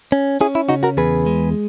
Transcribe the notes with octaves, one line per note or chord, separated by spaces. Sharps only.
C#4
C#4 E4 G#4
E4
C#3 D#4 F#4
F#4 A#4
E2 G#4 B4
G#3